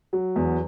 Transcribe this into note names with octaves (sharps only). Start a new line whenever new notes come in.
F#3
E2